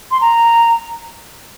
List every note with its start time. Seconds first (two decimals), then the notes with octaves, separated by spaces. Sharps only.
0.11 C6
0.21 A#5